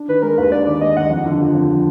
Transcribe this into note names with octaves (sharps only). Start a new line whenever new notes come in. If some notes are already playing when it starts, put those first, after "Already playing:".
Already playing: D4
D#3 B4
G#3 A#4
D#2 B4
D4 D5
D#3 D5
G#3 D#5
D#2 F#5
F2
D3
F3
F2